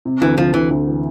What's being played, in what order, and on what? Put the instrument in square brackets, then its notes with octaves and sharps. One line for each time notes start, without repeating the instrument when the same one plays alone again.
[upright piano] C3
[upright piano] D2 [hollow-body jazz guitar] E3
[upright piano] D2 [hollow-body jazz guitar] F3
[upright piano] D2 [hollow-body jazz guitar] E3
[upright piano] D2
E3